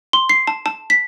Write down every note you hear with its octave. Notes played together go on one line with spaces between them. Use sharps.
C6
C7
A5
A5
B6